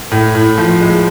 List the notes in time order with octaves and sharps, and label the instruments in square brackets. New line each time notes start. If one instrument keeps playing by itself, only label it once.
[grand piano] A2
A2
F3
G#3